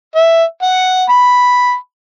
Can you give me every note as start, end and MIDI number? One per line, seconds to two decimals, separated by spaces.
0.15 0.44 76
0.62 1.04 78
1.09 1.75 83